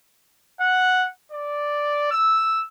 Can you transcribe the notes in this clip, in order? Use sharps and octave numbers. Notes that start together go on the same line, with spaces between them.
F#5
D5
E6